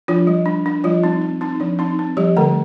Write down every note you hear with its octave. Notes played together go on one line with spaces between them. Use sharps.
F3 D4 F4
G3
D4
D4
F3 G3 F4
C4 D#4
C4
C4 D#4
F3 D4
C4 D#4
C4
F3 G3 G4
D3 A3 A4